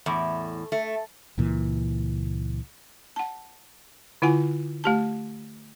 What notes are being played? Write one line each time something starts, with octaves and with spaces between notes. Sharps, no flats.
E2 A2
A3
C#2 A#2 E3
F#5 A5
D3 E4 F4 F#5 G#5
A3 G4 A5